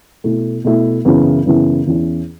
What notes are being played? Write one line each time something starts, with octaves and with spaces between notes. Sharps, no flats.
B2 A3 E4
B2 A3 E4
F#2 C#3 E3 B3 E4
F#2 C#3 E3 B3 E4
E2 E3 C#4 E4